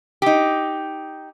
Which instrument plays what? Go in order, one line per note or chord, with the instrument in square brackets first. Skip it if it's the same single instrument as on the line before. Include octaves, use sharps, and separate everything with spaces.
[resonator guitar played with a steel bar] D#4 G4